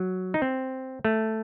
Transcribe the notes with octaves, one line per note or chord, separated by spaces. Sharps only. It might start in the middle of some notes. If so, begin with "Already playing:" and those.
Already playing: F#3
D#4
C4
A3